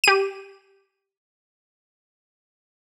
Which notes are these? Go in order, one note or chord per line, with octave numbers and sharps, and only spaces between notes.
G4 D#7